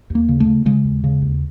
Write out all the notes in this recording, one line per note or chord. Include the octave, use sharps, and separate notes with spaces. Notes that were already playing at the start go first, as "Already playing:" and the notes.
D#2
A#3
C#3
A3
C#3
C#3 G#3
D#2
C#3
D#2